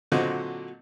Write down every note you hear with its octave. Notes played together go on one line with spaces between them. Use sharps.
A#2 D3 F#3 C4 F#4 D#5